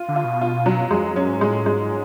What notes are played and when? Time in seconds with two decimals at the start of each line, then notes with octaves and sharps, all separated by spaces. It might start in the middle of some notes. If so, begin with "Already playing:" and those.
Already playing: F4
0.08 D3
0.16 F4
0.24 B2
0.41 F4
0.66 F#3
0.91 F2 G#3
1.03 F2
1.16 F#2 C#4
1.29 G#2
1.41 A2 G#3
1.66 G#2 G#3